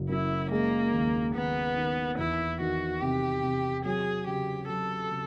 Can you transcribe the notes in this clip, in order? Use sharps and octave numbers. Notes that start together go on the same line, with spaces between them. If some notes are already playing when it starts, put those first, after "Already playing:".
Already playing: F#1 F#3
F#2 E4
G#3 A#3
D#2
D#2 B3
D#3
E2 E4
D#3 F#4
C3 G4
C3
F#3 G#4
C#3 G4
F#3 A4
C#3